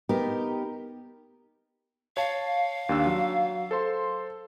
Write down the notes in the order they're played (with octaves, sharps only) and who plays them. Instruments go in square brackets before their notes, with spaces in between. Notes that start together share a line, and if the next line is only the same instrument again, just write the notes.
[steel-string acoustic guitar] B3 D#4 G4 A#4
[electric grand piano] C#5 A5 [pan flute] F5
[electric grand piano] D#2 D4 E6
F#3
A4 C5 C6